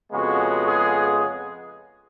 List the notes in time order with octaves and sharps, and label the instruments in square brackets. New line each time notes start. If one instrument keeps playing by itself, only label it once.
[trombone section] F2 C#3 G#3 B3 F#4
G#4